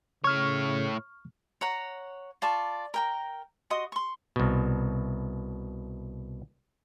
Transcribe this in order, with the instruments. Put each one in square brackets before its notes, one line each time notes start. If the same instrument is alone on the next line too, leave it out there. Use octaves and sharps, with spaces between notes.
[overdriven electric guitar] A2 C#5 [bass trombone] C#3 [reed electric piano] C#6 F6
[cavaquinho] C#5 F#5 A#5
F4 D5 A5 C#6
A#4 G5 A#5
F#4 D#5 C6 D#6
C6 C#6
[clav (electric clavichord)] C2 B2